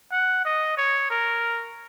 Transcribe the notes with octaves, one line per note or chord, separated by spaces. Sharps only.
F#5
D#5
C#5
A#4